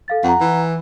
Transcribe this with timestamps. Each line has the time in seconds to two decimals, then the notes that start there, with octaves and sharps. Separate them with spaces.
0.08 A4 F5 A6
0.24 F2 F#5 A#5
0.41 E3